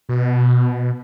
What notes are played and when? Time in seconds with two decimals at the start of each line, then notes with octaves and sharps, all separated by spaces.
0.09 B2